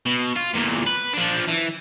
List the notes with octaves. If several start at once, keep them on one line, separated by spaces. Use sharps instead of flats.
B2
F4
E2 A#2
B4
F3 D4
E3